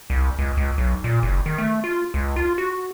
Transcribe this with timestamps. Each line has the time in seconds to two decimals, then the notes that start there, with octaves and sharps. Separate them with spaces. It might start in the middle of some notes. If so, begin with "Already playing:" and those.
0.10 C2
0.39 C#2
0.57 C#2
0.78 B1
1.04 A#2
1.23 F#1
1.46 D#3
1.58 A3
1.84 F4
2.14 C#2
2.36 F4
2.58 F#4